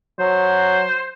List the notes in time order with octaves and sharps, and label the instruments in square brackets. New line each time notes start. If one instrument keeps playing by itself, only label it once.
[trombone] F#3 [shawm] C5